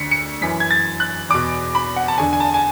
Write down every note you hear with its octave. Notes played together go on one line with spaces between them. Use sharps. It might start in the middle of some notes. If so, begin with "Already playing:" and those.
Already playing: D2 D3 B6 C#7
C#7
F#2 E3 B6
G#6
A6
F#6
E2 B2 D6
B5
F#5
A5
E2 D3 G#5
G#5
A5
G#5